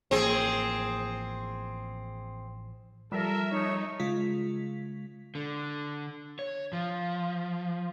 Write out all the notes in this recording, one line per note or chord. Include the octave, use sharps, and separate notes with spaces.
A1 F3 A#3 C4 G#4
F3 G3 A4 A#4 E5
A3 D#4 C#5 D#6
C#3 G#3 F4 B6
D3
C#5
F3